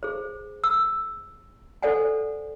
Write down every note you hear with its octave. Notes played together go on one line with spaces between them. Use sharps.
G#4 C5
E6
A4 C5 D5 F#5 G#5